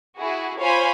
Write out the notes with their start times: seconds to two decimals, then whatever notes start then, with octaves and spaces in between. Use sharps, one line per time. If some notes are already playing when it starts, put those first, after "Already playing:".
0.17 E4 F#4 G#4
0.59 F4 C5 C#5 F5 G#5 B5